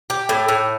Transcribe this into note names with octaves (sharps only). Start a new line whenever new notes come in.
G4
A2
A2